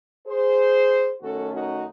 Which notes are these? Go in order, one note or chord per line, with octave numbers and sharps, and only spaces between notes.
G#4 C5
F#2 D#3 A3 C#4 F#4 A4
D#4 F#4